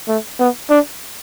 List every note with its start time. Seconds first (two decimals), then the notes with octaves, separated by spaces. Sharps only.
0.08 A3
0.40 B3
0.69 D4